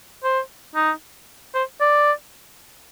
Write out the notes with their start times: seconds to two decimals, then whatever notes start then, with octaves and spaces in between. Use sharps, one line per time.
0.24 C5
0.75 D#4
1.55 C5
1.81 D5